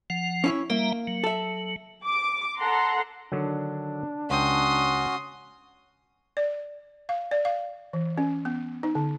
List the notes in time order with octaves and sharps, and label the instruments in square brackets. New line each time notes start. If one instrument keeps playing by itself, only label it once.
[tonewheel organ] F3 F#5
[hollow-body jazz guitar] C#4 E4 C#5
[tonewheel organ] G3 E5 A#5 [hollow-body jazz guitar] A#3
[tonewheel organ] F#3
[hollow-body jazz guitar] A4 E5
[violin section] D6
A4 F#5 A#5 C6
[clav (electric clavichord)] D3 D#3 F#3 [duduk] D4
[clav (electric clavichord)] C#2 G5 [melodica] C#4 F#4 [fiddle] C6 D#6
[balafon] D5
F5
D5
F5
E3
C#4
B3
D#4
D3